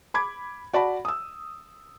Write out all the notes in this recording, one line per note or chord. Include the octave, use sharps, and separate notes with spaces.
B5 D6 G#6
F#4 D5 A5 B5
D#6 E6